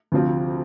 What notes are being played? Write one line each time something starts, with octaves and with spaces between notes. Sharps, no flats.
D2 C3 F3 C4